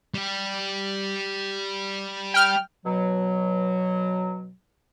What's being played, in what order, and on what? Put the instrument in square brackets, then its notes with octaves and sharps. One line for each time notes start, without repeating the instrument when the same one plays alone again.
[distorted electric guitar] G3 G4
[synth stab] G5 F6
[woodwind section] B2 F#3